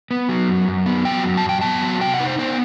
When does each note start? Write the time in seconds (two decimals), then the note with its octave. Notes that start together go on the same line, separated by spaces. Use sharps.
0.11 B3
0.29 F#3
0.48 F#2
0.68 F#2
0.86 B3
1.05 F#3 G5
1.25 F#2
1.37 A5
1.44 F#2
1.49 G5
1.61 B3 A5
1.82 F#3
2.01 C3 G5
2.14 F#5
2.20 D#4 B4
2.26 C5
2.39 B3 C5